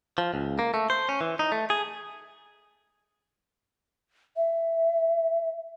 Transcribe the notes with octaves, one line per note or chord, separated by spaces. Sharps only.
F3
C#2
A#3
A3
C5
C#4
E3
D#4
A3
G#4
E5